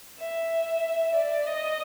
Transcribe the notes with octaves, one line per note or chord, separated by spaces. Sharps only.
E5
D5
D#5